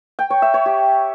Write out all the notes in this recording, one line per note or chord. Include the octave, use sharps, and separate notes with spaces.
G5
C#5
E5
C#5
G4